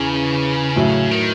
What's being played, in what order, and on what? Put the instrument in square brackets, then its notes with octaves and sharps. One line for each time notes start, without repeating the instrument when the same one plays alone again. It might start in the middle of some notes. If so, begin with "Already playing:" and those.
Already playing: [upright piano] E2 [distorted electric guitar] C#3
[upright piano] A2 F#3 A3
[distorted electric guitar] D#3